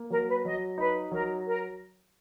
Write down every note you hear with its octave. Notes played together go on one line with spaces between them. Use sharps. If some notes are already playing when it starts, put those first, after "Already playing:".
Already playing: A#3
F#3 A#4
B4
F#3 D#5
D#4 B4
F#3 A#4
A#4